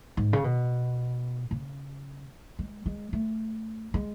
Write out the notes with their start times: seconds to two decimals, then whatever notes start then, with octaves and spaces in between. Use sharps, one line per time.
0.17 G#2
0.33 C#3
0.44 B2
1.51 C#3
2.59 G#3
2.86 G#3
3.13 A3
3.94 G#3